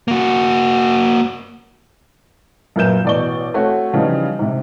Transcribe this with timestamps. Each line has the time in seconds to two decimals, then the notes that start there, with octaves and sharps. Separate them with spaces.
0.08 A#3 F#4
2.76 F#2 A#2 A#4 B4 G6 E7
3.05 A1 B2 D5 C#6 G7
3.54 A3 C4 F#4 C#5
3.94 C#3 E3 F3 G3 D#4
4.39 G#2 C3